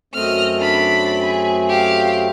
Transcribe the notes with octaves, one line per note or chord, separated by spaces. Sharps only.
F#2 A3 C4 D#5 F6
D4 B5
G#4
G4 F5